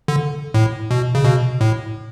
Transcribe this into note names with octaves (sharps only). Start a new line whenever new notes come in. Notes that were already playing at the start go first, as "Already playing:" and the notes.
D3
A2
B2
C#3
B2
A2